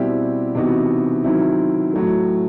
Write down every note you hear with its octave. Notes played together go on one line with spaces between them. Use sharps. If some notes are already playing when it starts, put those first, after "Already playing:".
Already playing: B2 G3 C4 E4 G4
C3 E3 B3 D#4 F#4
D#3 F#3 C4 E4
A2 F#3 A3